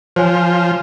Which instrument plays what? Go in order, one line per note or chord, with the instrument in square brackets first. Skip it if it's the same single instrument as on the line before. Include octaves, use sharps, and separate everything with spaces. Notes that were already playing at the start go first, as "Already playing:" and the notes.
[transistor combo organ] F3 [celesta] C5 C#5 G#5